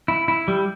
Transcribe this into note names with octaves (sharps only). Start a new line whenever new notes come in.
E4
E4
G3